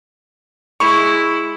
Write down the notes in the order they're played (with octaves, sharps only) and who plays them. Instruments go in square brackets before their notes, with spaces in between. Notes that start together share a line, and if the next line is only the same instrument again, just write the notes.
[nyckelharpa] G#3 E4 [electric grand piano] B5 C#6